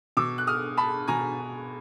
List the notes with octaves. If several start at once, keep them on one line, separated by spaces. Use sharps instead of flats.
B2 D6 E6
F#6
D#6 F6
A5 B5
B2 G#5 A#5